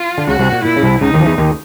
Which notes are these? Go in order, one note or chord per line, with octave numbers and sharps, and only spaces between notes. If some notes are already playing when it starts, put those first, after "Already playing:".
Already playing: F4
D3
C#2 C#3 F#4
C2 C3
A#2
A#2 E4
C#3
C2 C3
C#2 C#3 D#4
D#2 D#3
F3
E2 E3
D#2 D#3